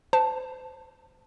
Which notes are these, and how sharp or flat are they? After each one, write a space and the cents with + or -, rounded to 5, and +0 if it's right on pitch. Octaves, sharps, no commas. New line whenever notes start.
C5 -35 A5 +0